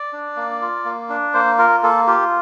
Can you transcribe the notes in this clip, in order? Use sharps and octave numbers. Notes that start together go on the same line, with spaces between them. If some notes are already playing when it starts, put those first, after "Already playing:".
Already playing: D5
D4
A#3
F4
A#3
D4
A#3 C5
F4 A#4
A#3 A4
F4 G4